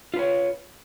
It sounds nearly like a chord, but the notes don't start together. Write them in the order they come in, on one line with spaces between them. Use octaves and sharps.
F4 B4 C#5